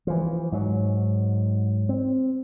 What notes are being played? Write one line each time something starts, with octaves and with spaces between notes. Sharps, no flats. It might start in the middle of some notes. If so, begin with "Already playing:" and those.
E3 F3
G#2 F#3
C4